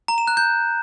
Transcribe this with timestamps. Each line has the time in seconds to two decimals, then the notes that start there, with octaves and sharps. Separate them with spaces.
0.08 A#5
0.18 E7
0.27 F#6
0.37 G6